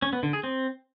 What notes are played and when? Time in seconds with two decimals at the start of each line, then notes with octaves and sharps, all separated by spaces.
0.02 C#4
0.13 B3
0.23 D3
0.33 G#4
0.44 C4